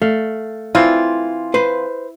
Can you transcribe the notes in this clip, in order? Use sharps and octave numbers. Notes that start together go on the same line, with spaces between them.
A3 F5
E3 C4 E4 F4
B4 C5